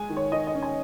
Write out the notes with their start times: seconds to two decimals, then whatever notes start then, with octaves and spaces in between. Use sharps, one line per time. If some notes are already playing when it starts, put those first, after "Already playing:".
Already playing: G#3 G#5
0.10 D#3
0.17 C#5
0.32 D#3 D#5
0.47 D#5
0.55 C#4
0.62 G#5